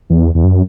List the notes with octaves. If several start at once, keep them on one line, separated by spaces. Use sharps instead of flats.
E2
E2
F#2